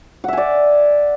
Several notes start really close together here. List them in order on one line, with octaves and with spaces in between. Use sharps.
F#5 E5 G#5 D5